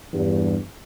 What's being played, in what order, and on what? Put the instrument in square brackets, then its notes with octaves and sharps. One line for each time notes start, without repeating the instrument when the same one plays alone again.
[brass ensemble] E2 G2